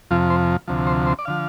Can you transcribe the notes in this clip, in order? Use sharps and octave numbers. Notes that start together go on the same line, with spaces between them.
F2 C3 F3 F4
C5
D2 C3 F3
C5
C5
D5
D3 F3 F5